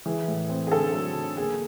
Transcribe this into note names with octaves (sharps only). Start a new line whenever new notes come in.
E3 G#4
A2
C4
G#4
D3 A4
F#3
D3
A#3 G#4